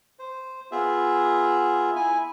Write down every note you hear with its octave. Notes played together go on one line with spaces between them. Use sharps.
C5
B3 F4 G#4 E5
E4 G#5